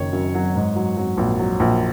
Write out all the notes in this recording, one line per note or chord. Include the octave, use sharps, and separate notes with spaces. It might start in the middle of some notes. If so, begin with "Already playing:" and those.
Already playing: F#1 F#2 D#3 C#5
F#2
F#3
G#2
F#3
F#3
A#1
F#3
A#1